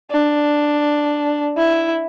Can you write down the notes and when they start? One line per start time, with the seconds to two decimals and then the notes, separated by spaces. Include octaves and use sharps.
0.12 D4
1.58 E4